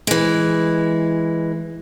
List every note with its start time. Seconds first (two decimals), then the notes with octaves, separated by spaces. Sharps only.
0.07 E3 G#3